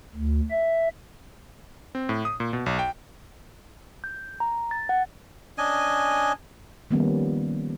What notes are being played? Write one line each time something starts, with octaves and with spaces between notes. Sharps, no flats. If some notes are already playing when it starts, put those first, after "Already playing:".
D2
E5
C4
A2
D#6
A#2
B2
B1
G5
G6
A#5
A6
F#5
C#4 D4 D#5 G#5
D#3 F3 G3 A#3 B3 C#4